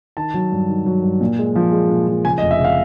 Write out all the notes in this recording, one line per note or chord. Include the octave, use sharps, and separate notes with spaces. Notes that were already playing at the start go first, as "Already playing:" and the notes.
D#3 A5
F#3
G2
D#3
F#3
G2
A#2
G#3
F3
G#3
A#2
F3
C#3 G#5
D#5
F1
E5
C#3
F5